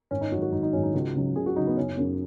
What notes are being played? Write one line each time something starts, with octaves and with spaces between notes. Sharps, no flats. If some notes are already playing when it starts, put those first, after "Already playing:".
G#1 C#4
D#4
G#2 F#3 F#4
F#4
G#1 D#4
D#4
G#2 F#3 C#4
D#4
C#2 F#4
C#3 F#3
C#2 G#4
F#4
C#3 F#3 D#4
B3
F#1 C#4
F#2 C#3 F#3